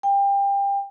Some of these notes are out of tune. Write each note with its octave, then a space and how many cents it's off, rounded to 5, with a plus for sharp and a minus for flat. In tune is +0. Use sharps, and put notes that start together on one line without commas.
G5 +25